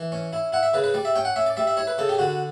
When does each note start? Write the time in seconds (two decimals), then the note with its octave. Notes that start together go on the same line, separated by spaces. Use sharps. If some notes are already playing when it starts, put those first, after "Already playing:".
Already playing: E3
0.12 C#4
0.33 E4
0.53 E4 F#5
0.63 E5
0.74 C#3 B4
0.84 B4
0.94 G3 D5
1.05 E5
1.16 C#4 G5
1.25 F#5
1.36 C#4 E5
1.46 D5
1.57 G3 E5
1.67 E5
1.77 E4 C#5
1.87 B4
1.98 C#3 A4
2.09 G4
2.19 D3 F#4